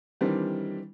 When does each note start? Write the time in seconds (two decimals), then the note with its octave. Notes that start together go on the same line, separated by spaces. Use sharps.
0.21 D#3 E3 G3 C4 D4